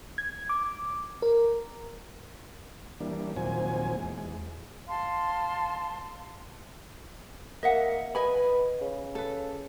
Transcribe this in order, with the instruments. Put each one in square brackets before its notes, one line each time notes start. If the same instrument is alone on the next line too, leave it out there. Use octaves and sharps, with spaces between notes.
[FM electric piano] G#6
D6
A#4
[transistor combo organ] E3 G3 A#3 D4
D#2 A#2 F3 F#3 C4 G#5
E2 G#3
[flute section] F5 A5 C6
[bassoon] A#3 [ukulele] D#5 E5 F#5
[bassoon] B4 [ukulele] D#5 G#5 B5
[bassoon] C#3
[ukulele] A4 B4